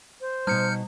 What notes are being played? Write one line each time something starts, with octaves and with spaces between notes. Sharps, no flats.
C5
B2 G3 D#4 F6 G6 C#7